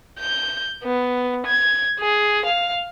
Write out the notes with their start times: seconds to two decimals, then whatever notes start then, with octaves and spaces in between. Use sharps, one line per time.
0.19 G6
0.83 B3
1.45 G#6
1.99 G#4
2.46 F5